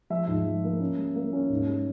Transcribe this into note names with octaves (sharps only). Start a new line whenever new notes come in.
F3 E5
G#2
F3
A#3
C#4
G3
A#3
C#4
G#2
G3